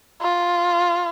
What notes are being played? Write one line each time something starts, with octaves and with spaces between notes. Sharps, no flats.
F4